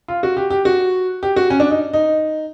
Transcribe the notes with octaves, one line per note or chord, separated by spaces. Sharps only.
F4
F#4
G4
G4
F#4
G4
F#4
C#4
D4
D#4
D#4